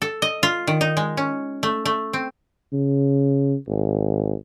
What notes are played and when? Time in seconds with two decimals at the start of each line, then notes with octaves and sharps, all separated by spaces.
0.02 A4
0.22 D#5
0.43 F4
0.67 D#3
0.81 D#4
0.97 G#3
1.17 C#4
1.63 A3
1.85 A3
2.13 C4
2.73 C#3
3.68 G#1